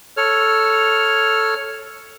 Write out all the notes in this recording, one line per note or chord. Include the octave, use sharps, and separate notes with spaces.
A4 C#5 F6